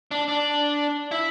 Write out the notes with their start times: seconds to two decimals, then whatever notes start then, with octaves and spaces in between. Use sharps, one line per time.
0.11 D4
0.28 D4
1.11 E4